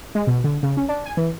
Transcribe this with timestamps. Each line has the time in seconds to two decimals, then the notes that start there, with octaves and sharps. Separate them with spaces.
0.15 G#3
0.27 B2
0.44 D3
0.63 C#3
0.77 C#4
0.89 D4
1.06 G#5
1.17 E3